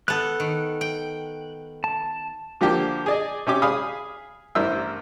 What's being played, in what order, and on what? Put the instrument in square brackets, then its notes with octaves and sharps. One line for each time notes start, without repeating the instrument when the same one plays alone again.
[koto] B3 A4 [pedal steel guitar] F#6
[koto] D#3
G5
[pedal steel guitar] A5
[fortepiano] D3 F3 A#3 G4
G#4 D5 D#5
C3 C#4 G4 D6
G#4 F5 B5 D#6
A1 G2 E4 A#4 C5 E6